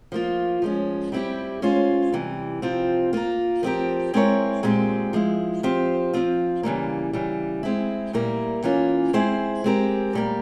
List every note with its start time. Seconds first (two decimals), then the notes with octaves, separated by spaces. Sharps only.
0.12 F3 A#3 F4
0.62 F3 G#3 C#4
1.12 G3 C4 E4 G4
1.62 G#3 C#4 F4 C5
2.12 C3 E3 G3
2.62 C3 F3 C4 F4
3.13 A#3 F4 A#4
3.63 F3 C4 G4 A#4
4.14 G#3 C4 E4 A#4 C#5
4.63 A#2 G#3 C4 G4
5.13 F3 G#3 E4
5.63 F3 C4 G4 C5
6.13 F3 C4 F4
6.63 C#3 E3 G3 A#3
7.13 C#3 E3 G3
7.63 G#3 C4 E4
8.13 A#2 G3 A#3 E4 A#4
8.63 E3 A#3 C#4 F4
9.13 G#3 C4 E4 G#4 C5
9.64 G#3 C4 G4 A#4
10.13 A#2 G3 A#3